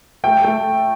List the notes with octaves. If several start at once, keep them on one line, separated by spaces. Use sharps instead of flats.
A3 G5
A3